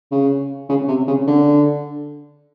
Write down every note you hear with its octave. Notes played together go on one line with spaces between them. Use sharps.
C#3
C#3
C3
C#3
D3